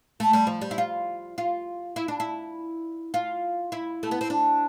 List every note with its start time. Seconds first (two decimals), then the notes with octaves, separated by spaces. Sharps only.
0.20 A3
0.33 G3
0.47 F3
0.61 G3
0.71 E4
0.78 F4
1.38 F4
1.96 E4
2.08 D4
2.20 E4
3.14 F4
3.72 E4
4.03 A3
4.11 B3
4.21 C4
4.30 D4